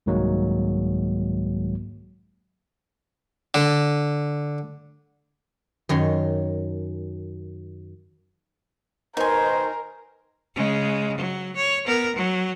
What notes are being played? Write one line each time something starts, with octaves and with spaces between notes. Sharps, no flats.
C2 G#2 D#3 F#3 G#3 A#3
D3
F#2 D#3 C#5 C6
B2 D#3 D#4 A#4 C5 G#5
C#3 G#3
F#3
C#5
B3 A#4
F#3